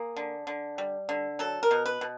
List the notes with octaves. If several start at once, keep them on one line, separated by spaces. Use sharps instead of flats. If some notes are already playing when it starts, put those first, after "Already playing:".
Already playing: A#3 G#4
D3
D3
G3
D3
F#3 A4
A#4
B2
B4
B2